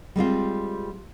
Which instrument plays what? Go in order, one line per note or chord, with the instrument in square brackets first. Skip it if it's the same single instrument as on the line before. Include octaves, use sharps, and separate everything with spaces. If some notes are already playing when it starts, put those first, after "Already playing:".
[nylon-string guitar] G3 G#3 C4 F4